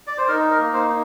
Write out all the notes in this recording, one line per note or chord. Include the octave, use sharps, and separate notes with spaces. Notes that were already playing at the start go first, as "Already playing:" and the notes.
D5
C5
D#4 A#4
A#4
A#3
C5
D#4